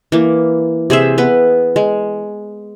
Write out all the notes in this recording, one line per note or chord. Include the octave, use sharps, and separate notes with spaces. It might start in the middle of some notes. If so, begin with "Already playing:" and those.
E3 A#3
C3 G#4 C5 E5
B3 B4
G#3